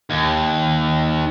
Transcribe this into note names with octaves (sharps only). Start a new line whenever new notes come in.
D#2